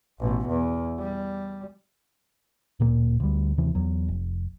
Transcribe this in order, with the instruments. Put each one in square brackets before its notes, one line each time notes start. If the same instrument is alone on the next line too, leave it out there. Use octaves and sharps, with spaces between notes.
[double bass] A1 B2
E2
G3
[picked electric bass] D1 A#2 A#3
D2 G3
D#2 C3 E3
E2 F#3
F1